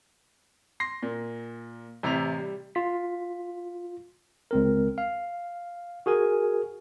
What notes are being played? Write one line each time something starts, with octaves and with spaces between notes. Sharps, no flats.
C6 A#6 C7
A#2
A1 C3 E4 E5 A#5 F7
G3
F4 B6
C#2 C4 A#4
F5
F#4 G#4 A#4 G#5